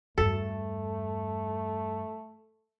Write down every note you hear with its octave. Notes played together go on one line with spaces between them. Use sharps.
E2 G2 A3 A4